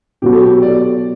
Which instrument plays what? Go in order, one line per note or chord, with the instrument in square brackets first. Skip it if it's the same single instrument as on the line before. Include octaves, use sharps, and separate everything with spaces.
[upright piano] B2 F#3 B3 F#4 [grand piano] G4
[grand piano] A4
G4
D5